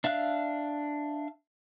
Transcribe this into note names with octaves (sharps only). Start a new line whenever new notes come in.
D4 E5 F5 F#6